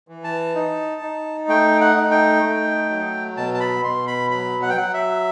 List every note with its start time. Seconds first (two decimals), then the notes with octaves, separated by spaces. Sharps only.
0.08 E3
0.24 A5
0.55 D#4
1.01 D#4
1.48 A3 G5
1.81 F#5
1.96 D#4
2.11 G5
2.43 A3
2.90 F#3
3.37 B2 A5
3.54 A5
3.60 B5
3.84 B2 C6
4.07 B5
4.31 F#3 B5
4.62 F#5
4.70 G5
4.77 F#3 F#5
4.94 E5